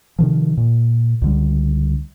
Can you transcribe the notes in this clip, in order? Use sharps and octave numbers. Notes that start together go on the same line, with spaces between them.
C3 D#3 F3
A#2
C#2 D3 G3